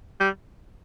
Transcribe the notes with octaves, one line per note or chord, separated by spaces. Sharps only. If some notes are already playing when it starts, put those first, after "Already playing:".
G3